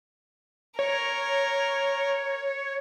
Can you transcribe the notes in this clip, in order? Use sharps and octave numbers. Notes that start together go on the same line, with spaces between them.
A#4 C#5